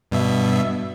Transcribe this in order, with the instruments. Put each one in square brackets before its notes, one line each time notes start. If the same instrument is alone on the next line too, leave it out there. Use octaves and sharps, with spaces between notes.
[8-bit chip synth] G2 B2 E5